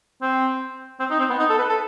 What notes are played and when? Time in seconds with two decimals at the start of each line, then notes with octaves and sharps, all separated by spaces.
0.22 C4
1.00 C4
1.11 D#4
1.20 C4
1.29 B3
1.39 D#4
1.50 A4
1.59 B4
1.69 A4